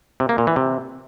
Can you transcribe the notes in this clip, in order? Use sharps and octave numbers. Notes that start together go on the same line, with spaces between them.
C3
A#3
A#2
E3
C3